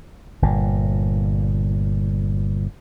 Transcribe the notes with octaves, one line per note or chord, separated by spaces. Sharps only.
G1 A#2